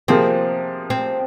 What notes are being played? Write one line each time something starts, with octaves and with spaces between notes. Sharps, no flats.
C3 F3 A#3 C4 F4 G#4
C4